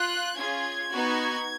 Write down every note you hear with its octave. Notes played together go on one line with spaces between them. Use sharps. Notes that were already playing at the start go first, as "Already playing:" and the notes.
Already playing: F4 F#6
C#4 F4 G#4 G#6
B3 D#4 F#4